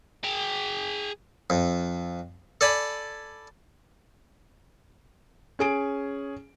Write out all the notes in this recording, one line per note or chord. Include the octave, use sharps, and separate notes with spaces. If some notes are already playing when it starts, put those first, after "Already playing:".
G#4 G5
F2
A4 D5 G#5 B5
C#4 G#4 D7